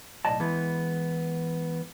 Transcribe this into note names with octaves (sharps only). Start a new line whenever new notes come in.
B1 A2 D5 D#5 A5
E3 G#3 B3